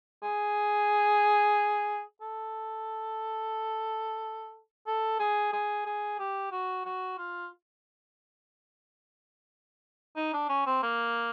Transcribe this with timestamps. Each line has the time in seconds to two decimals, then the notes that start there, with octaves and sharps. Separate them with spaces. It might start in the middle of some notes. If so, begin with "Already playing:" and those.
0.23 G#4
2.21 A4
4.87 A4
5.19 G#4
5.53 G#4
5.86 G#4
6.19 G4
6.52 F#4
6.85 F#4
7.18 F4
10.16 D#4
10.33 D4
10.49 C#4
10.66 C4
10.83 A#3